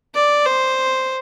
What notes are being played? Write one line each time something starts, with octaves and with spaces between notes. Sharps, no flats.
D5
C5